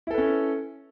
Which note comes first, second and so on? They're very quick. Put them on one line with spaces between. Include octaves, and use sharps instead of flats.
E4 A4 B4 C#4